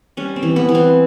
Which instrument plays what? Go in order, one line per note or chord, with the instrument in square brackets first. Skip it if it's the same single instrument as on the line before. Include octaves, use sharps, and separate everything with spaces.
[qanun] G3 C#4
C4
E3
B3
E3
C4